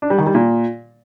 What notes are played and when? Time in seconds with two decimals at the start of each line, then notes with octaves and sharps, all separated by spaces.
0.02 D4
0.10 G3
0.18 D#3
0.26 G3
0.35 A#2